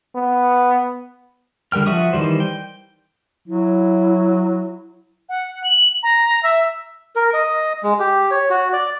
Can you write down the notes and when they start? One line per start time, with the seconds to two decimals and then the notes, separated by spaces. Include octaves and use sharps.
0.16 B3
1.72 D3 G3 A#4 G5 F6
1.86 F3 F#4 E5 C#6 D#6
2.13 D#3 E3 G3 C5
2.40 G5
3.48 F#3 E4
5.29 F#5
5.64 F#7
6.03 A#5
6.43 E5
7.16 A#4
7.34 D#5
7.83 G#3
8.00 G4
8.31 C#5
8.50 F#4
8.73 D5